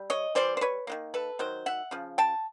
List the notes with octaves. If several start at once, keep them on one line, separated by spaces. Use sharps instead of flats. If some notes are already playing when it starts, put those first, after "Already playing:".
Already playing: G3
C#5 D#5
E3 G3 C5 D5
C5
B4 C#5
D#3 F#3 A#3
A4 B4
D#3 F#3 C5
E5 F#5
C#3 F3
G5 A5